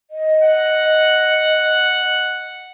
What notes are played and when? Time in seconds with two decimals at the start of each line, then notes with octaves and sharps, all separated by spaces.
0.11 D#5
0.43 F#5